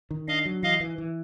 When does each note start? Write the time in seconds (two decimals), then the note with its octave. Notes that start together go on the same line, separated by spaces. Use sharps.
0.11 D#3
0.28 D4 D#5 F5
0.46 F#3
0.63 E3 D#5 F5
0.80 E3
0.98 E3